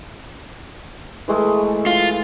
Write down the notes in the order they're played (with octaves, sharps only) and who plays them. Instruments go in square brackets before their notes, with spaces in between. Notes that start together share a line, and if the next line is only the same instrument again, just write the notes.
[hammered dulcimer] E3 G#3 A3
[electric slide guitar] F4